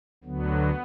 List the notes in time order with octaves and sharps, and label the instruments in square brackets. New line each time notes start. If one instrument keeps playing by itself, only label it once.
[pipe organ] D2 D3 F#3 B3